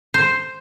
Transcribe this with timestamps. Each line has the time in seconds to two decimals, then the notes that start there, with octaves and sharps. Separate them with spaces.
0.14 C5